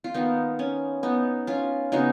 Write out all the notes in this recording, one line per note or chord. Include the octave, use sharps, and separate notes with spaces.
F4
D#3 A#3 B3 D#4
C#4
B3 D#4
C#4 F4
C#3 G#3 B3 D#4 F#4